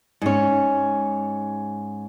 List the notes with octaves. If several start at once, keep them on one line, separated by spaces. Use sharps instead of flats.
G#2 C#4